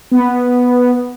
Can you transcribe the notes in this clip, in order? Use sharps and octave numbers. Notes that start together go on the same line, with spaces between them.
B3